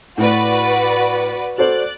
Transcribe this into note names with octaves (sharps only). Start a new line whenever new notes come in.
A2 F#4 B4 D5
F#4 A4 C5 D5 F#6